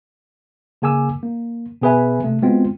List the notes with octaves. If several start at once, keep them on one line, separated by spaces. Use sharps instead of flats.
C#3 A#3 G#4 G#5 D6 E6
A#3
B2 B3 G#4 B4 E5 G#5
C3 A3
G#3 B3 C4 F4 F#4